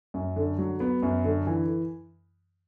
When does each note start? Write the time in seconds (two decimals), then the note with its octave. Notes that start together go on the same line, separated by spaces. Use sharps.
0.14 F#2
0.36 D3
0.59 F#3
0.80 B3
1.03 F#2
1.24 D3
1.47 E3